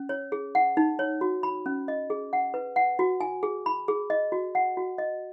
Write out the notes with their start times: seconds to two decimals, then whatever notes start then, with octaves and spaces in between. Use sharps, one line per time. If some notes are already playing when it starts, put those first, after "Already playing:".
Already playing: C#4
0.09 C#5
0.32 G#4
0.55 F#5
0.77 D#4
0.99 C#5
1.21 F#4
1.43 B5
1.66 C#4
1.88 D#5
2.10 G#4
2.33 F#5
2.54 B4
2.76 F#5
2.99 F#4
3.21 G#5
3.43 G#4
3.66 B5
3.88 G#4
4.10 D#5
4.32 F#4
4.55 F#5
4.77 F#4
4.98 D#5